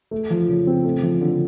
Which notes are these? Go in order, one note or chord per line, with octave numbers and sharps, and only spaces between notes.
A3
F3
C#3
C4
A3
F3
D3